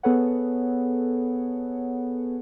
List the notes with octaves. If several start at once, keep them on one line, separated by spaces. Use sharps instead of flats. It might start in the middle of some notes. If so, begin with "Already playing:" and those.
B3 G#4 A4 B4 C#5 F#5